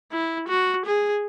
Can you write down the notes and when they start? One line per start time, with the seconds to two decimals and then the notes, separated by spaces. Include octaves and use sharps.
0.12 E4
0.48 F#4
0.85 G#4